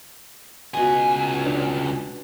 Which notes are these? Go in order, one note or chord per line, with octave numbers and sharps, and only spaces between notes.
C#2 B2 D#5 G#5
D4